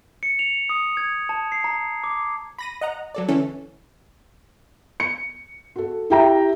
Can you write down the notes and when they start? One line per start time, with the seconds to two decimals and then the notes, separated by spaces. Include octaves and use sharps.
0.23 C#7
0.39 F7
0.69 D#6
0.97 G#6
1.29 A5
1.52 C7
1.64 A#5
2.04 D6
2.59 B5 A#6 D#7
2.81 D#5 F#5 A#5
3.15 F#3 A4 D5
3.28 D3 E3 C#4 A4
5.00 C#7
5.76 F#4 A4
6.10 E4 G4 E5 G5 A#5